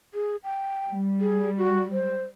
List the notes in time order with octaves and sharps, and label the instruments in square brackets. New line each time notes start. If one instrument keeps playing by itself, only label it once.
[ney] G#4
G5
[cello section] G3
[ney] G#4
F#4
C5